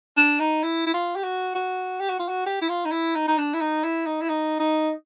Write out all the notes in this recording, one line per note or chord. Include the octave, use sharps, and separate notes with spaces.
D4
D#4
E4
E4
F4
G4
F#4
F#4
G4
F#4
F4
F#4
G4
E4
F4
D#4
E4
D#4
D#4
D4
E4
D#4
E4
D#4
E4
D#4
D#4